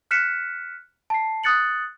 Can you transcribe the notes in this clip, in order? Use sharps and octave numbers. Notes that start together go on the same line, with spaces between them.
F6 F#6 B6 C#7 E7
A5 C7
D#6 F#6 A6 C#7 F#7